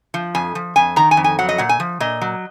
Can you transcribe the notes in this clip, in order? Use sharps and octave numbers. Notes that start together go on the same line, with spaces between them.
F3
F2 G#5
F3
F2 G#5
D#3 A#5
G#5
F2
G#5
F#3 F#5
D#5
A#2 F#5
G#5
F3
A#2 D#5
F#3